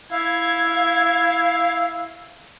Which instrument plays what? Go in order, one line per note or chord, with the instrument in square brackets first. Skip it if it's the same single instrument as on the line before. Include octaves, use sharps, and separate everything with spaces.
[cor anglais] E4 [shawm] F5 [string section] G#6